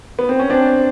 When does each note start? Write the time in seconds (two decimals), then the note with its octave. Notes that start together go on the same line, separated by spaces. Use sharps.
0.19 B3
0.29 C4
0.39 C#4
0.50 C4 D4